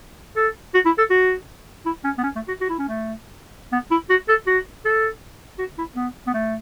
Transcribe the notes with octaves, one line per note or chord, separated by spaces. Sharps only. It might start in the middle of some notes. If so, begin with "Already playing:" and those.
A4
F#4
E4
A4
F#4
E4
C#4
B3
C#4
A3
F#4
F#4
E4
C#4
A3
B3
E4
F#4
A4
F#4
A4
F#4
E4
B3
B3
A3